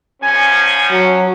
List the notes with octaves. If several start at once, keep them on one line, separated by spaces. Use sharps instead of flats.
E2 F3 C#4 G#5
F#3